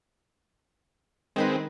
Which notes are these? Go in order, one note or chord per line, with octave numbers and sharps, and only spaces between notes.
D#3 G#3 C4 D#4 B4